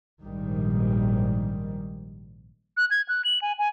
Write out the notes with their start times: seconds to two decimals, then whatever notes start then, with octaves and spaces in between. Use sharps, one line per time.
0.23 A#1 G#2 D#3 G3
2.77 F#6
2.91 G#6
3.09 F#6
3.25 F#7
3.42 G#5
3.59 G#5